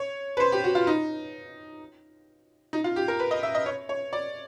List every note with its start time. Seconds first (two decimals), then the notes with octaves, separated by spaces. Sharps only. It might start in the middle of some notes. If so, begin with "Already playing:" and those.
Already playing: C#5
0.37 B4
0.40 C5
0.52 G4
0.64 F#4
0.75 F4
0.87 D#4
2.73 D#4
2.84 F4
2.96 G4
3.08 A#4
3.19 B4
3.31 D#5
3.43 E5
3.55 D#5
3.66 C#5
3.89 C#5
4.13 D5